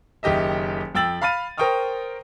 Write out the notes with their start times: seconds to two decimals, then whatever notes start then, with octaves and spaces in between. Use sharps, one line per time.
0.23 F#1 D#3 G4 D#5 E5
0.95 F2 G5 E6 A6 F#7
1.22 F5 B5 F6 A6 D#7
1.58 A#4 C5 G5 C#6 D#6 F6